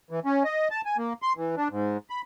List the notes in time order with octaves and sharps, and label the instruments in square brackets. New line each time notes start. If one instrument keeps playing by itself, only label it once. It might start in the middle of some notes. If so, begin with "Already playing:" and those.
[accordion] E3
C#4
D#5
A5
G#5
A#3
C6
E3
D4
G#2
B5